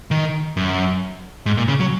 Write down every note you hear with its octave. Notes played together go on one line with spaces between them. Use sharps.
D#3
F#2
G#2
A#2
C#3
F#3